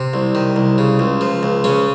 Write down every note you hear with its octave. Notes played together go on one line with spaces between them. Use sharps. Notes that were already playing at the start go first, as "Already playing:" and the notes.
Already playing: C3
C2
D#3
C2
C#3
C#2
F3
C#2
C#3 C#4